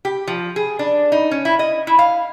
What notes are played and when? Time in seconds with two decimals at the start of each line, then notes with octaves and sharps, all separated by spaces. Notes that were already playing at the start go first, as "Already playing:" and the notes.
0.05 G4
0.27 F3
0.56 G#4
0.79 D4
1.12 D#4
1.31 C#4
1.45 E4
1.59 D#5
1.87 E4
1.99 F5